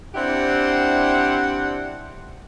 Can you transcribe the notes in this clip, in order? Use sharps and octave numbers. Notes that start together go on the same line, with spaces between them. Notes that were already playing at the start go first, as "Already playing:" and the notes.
C4 D4 E4 G4 C5 F#5